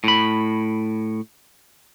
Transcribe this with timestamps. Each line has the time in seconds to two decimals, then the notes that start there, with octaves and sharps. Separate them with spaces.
0.04 A2 B5